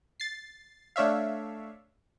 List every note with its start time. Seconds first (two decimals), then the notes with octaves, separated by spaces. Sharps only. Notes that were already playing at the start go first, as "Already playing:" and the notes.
0.20 A6 C7
0.96 A3 D4 C#5 E5 F5